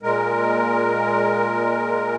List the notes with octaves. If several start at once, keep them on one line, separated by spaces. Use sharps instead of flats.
A#2 G#3 A#4